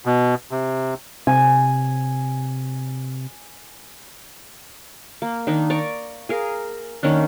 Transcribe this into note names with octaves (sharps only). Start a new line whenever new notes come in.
B2
C3
C3 G#5
A#3
D#3 D4 D#4
D5 A#5 C#6
G#4 A#4 F5
D#3 A#3 C#4 D4